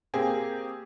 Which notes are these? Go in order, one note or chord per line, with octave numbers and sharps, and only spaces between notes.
A#3 C4 G4 G#4